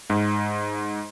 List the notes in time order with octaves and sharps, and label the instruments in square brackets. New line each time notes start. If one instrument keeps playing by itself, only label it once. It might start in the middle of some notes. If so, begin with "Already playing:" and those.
[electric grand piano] G#2